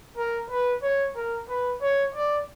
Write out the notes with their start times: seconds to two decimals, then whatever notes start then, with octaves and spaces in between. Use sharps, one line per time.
0.17 A#4
0.50 B4
0.82 C#5
1.15 A#4
1.49 B4
1.82 C#5
2.14 D5